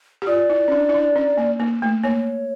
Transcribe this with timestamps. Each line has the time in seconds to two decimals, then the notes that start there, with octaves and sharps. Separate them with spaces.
0.22 G4
0.27 F4 D5
0.50 E4
0.68 C#4
0.72 D4
0.89 E4
0.94 D4
1.16 C#4
1.37 A#3
1.60 A#3
1.82 A3
2.03 A#3 C#5